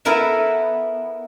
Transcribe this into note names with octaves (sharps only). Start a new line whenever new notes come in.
B3 E4 A4 A#4 E5